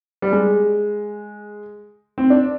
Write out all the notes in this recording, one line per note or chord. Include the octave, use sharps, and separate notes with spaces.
G3
G#3
C4
D4